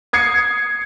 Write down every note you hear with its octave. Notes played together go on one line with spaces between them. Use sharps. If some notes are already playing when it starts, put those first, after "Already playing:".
D#6 G#6 C7 C#7